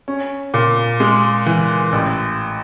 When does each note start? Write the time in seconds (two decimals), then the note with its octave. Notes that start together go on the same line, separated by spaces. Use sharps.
0.08 C#4
0.54 A#2
1.00 G#3
1.46 E3
1.92 A1